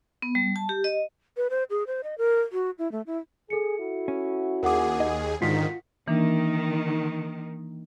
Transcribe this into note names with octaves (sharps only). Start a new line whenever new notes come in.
B3
G3
A5
G4
D#5
B4
C5
G#4
C5
D#5
A#4
F#4
E4
A3
E4
G#4 A4 C#7
E4 F#4
C#4
D#2 G#4 A#4 F#5 D6
D#5
F2 G#2 D3 D#3 F4 F#4 B6
D#3 E3 A#3 D4